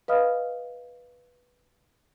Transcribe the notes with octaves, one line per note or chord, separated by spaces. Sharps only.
B4 D#5 F5 B5 D#6 F6